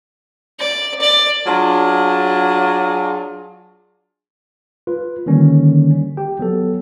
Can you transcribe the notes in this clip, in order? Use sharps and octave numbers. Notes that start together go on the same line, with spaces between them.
D5
D5
F#3 D4 F4 G#4
F4 B4
D3 D#3 G3 A#3 C#4
G4 G5
F#3 B3 A4